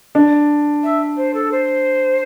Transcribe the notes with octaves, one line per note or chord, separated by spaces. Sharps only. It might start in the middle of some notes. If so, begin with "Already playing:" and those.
D4
E5
C5
A4
C5